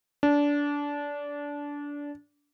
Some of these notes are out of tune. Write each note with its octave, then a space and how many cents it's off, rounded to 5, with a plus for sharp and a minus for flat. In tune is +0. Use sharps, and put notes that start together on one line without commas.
D4 -20